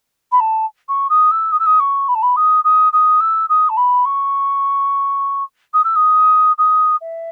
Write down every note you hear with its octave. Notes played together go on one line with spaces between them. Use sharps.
B5
A5
C#6
D#6
E6
D#6
E6
D#6
C#6
B5
A5
B5
D#6
D#6
D#6
E6
D#6
A5
B5
C#6
D#6
E6
D#6
D#6
E5